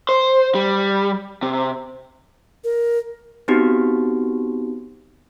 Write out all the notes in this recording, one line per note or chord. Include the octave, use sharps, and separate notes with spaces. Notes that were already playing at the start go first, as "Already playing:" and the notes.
C5
G3
C3
A#4
B3 C4 D#4 F#4 G4